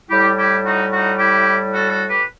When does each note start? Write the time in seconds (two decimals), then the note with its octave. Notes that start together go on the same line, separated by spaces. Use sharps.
0.10 A2 G3 E4 G4
0.37 E4 G4
0.64 D#4 F#4
0.91 D#4 F#4
1.18 E4 G4
1.72 F#4 A4
1.89 F#4 A4
2.07 G4 B4